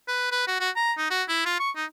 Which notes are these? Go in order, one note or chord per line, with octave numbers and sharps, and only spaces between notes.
B4
B4
F#4
F#4
A#5
D#4
F#4
E4
F4
C#6
D#4